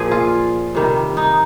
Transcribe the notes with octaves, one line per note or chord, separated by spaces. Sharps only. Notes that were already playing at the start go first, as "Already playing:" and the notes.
Already playing: A#2 F3 G#4
F4
C3 D#3 G3
D#4